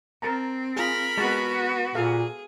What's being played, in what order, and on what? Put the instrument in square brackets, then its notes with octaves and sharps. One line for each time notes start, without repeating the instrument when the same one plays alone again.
[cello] C4 [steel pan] A#4 A5 A#5
[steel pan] F4 G#4 [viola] A#4 B5
[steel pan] G#3 A5 [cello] B3 F#4
[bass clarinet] A#2 [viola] G#4 [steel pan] A4 F5